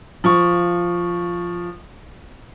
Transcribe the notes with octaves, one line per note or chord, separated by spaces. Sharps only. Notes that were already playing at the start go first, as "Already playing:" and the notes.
F3 C#6